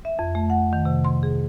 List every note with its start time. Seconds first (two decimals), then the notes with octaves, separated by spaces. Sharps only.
0.05 E5
0.19 F2
0.35 A3
0.50 F#5
0.73 D#3
0.85 C3
1.05 C6
1.23 G#4